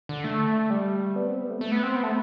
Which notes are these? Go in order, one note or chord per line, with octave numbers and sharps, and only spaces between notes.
D3
A3
G3
B3
C4
B3
A3
A3
B3
C4
B3
A3